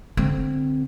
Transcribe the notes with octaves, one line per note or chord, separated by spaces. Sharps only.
D3 C4